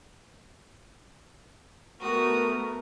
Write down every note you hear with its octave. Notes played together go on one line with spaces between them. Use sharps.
A3 B3 F#4 A#4 D#6